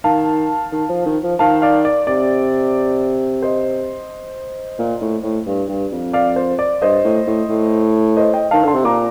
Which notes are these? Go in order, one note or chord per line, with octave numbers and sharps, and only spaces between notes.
D#3 F5 A5
D#3
F3
D#3
F3
D#3 F5 A5
D5 F5
D5
C3 D5
C5 D#5
A#2
A2
A2
G2
G2
F2
D5 F5
C5
D5
G2 C5 D#5
A2
A2
A2
C5 D#5
D#5 G5
D#3 F5 A5
D3 A5 C6
C3
A#2 A#5 D6